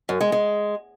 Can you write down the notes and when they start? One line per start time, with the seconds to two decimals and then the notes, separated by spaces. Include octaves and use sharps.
0.09 F#2
0.21 G#3
0.32 G#3